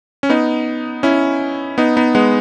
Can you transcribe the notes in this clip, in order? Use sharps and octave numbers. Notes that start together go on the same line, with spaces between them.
C#4
B3 D#4
C#4 E4
B3 D#4
B3 D#4
G#3 B3